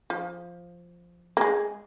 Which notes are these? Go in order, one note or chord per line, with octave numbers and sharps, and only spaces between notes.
F3
A#3
G#3